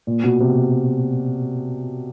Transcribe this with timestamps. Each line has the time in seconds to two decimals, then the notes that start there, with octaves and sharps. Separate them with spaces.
0.07 A#2
0.24 B2
0.40 C3